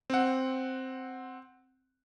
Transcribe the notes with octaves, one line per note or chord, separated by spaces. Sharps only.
C4 F#5